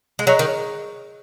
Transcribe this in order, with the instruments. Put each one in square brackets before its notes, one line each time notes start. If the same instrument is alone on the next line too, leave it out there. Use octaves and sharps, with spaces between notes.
[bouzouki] G#3
[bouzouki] F#3 [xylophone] G#4 D#5 A#5 C#6 F#6
[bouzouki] D#3